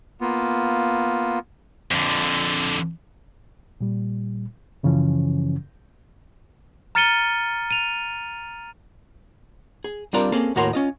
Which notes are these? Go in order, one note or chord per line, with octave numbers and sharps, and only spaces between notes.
A#3 B3 F4
F2 D3
A#2 G3
F#2 C#3 E3 F3 C#4
A#5 F6 A6 C#7 D#7 G7
D#7 F7
G#4
G3 C4 D4 F4 A#4 D5
A#3 C4 C#4 G#4 A4
D#2 A2 F#4 A#4 C#5 C6
C#4 F4 D#5